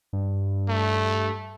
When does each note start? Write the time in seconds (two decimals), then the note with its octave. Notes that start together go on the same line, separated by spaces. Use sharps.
0.13 G2
0.69 A3